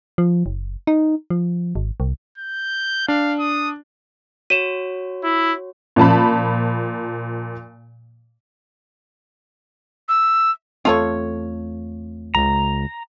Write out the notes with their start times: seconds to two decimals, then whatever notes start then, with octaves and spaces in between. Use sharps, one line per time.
0.18 F3
0.46 F#1
0.87 D#4
1.30 F3
1.75 G#1
2.00 C2
2.38 G6
3.08 D4 F5
3.39 D#6
4.50 F#4 C#5 D#7 E7
5.24 E4
5.96 A#2 F3 A5 B5
10.09 E6
10.85 E2 A3 C4 F4 A4 C#5
12.35 C#2 A#5